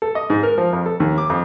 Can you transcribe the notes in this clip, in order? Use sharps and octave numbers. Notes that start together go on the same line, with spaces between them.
A4
D#5
G#2
A#4
F3
F2
A4
D#2
D6
F2